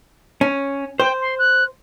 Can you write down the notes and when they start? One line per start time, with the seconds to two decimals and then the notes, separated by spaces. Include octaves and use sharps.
0.41 C#4
1.00 C5 G5
1.21 C6
1.39 F#6